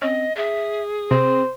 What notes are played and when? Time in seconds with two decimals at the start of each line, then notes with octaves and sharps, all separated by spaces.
0.02 C4 C#4 D#5
0.36 G#4 E5
1.11 C3 C4 C5